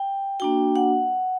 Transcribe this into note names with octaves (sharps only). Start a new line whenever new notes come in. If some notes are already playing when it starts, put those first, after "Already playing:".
Already playing: G5
A#3 D4 F#4 G5
F#5